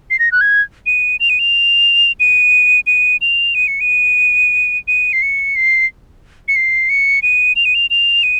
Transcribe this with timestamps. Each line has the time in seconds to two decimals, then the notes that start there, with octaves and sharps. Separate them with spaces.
0.10 C7
0.19 A#6
0.32 F#6
0.41 G#6
0.86 D#7
1.20 F7
1.30 D#7
1.39 F7
2.20 D#7
2.87 D#7
3.21 F7
3.55 D#7
3.68 C#7
3.81 D#7
4.88 D#7
5.13 C7
5.22 C#7
5.56 C7
6.48 C#7
6.56 C7
6.89 C#7
7.23 D#7
7.56 F7
7.65 D#7
7.75 F7
7.90 F7
8.23 D#7